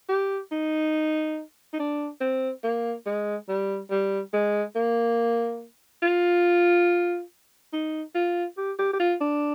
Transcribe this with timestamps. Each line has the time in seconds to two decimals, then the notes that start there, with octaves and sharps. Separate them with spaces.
0.09 G4
0.52 D#4
1.73 D#4
1.79 D4
2.21 C4
2.64 A#3
3.07 G#3
3.49 G3
3.91 G3
4.34 G#3
4.76 A#3
6.03 F4
7.73 D#4
8.15 F4
8.58 G4
8.79 G4
8.93 G4
9.00 F4
9.21 D4